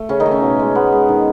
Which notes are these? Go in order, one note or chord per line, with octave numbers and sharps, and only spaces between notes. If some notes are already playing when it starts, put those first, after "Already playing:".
Already playing: A3
C#3 C#4
D#3 D#4
A3
C#4
B2
G#3
G#3 B3
G#3
D#3